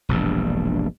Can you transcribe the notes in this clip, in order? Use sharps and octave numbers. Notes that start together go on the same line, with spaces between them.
E1 A#1 G2